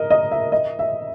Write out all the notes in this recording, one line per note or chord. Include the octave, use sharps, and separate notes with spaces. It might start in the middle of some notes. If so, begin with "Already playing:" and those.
Already playing: A#4 D#5
D#5
E5
D#5
E5